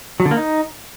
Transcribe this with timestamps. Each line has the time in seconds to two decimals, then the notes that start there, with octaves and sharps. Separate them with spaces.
0.20 F#3
0.25 D3
0.31 A#3
0.37 D#4